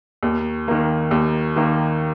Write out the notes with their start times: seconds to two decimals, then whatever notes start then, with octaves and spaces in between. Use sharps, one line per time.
0.23 D#2
0.68 D#3 A#3
1.11 D#2
1.56 D#3 A#3